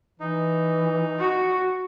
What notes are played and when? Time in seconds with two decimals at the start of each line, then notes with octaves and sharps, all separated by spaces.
0.20 E3 D#4
1.19 F#4